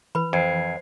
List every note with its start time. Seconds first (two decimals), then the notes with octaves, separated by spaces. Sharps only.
0.15 E3 B4 B5
0.33 F2 C5 G#6 C7